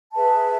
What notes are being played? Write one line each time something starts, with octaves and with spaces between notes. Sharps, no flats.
G#4 B4 E5 A5